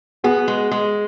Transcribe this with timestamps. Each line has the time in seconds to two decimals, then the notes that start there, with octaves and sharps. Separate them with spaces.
0.24 B3 F#4 G#4
0.48 G#3
0.71 G#3